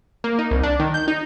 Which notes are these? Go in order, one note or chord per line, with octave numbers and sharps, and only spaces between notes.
A#3
D#4
C2
D4
D#3
G6
D#4